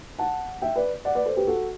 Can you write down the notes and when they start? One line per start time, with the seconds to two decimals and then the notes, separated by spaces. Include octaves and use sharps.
0.19 F#5 A5
0.62 E5 G5
0.76 B4 D5
1.05 D5 F#5
1.15 B4 D5
1.26 A4 C5
1.36 G4 B4
1.47 F#4 A4